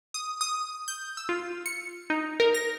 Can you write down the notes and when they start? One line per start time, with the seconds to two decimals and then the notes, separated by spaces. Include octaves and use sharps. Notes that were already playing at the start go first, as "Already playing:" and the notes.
0.14 D#6
0.41 D#6
0.88 G6
1.17 E6
1.29 F4
1.66 C#7
2.10 D#4
2.40 A#4
2.54 A#6